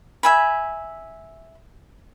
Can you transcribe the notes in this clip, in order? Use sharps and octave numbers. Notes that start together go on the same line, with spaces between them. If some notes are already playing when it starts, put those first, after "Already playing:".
E5 G#5 B5